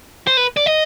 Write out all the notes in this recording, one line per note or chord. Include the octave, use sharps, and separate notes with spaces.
C5
B4
D5
D#5